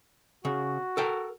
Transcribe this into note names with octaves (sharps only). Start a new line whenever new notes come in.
C#3 F#4
A4 A#4 G5